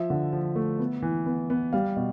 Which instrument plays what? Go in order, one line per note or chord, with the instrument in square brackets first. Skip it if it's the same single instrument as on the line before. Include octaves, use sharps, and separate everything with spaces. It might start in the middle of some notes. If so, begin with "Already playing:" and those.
Already playing: [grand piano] F3 E5
D3
F3
A3
B3
E3
B3
B3
G3 F5
B2